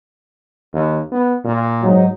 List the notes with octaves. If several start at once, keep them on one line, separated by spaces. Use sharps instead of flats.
D#2
B3
A#2
G#2 F#3 D#4